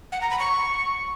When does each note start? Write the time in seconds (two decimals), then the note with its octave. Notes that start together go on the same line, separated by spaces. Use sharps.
0.12 F#5
0.21 A#5
0.30 B5
0.39 C#6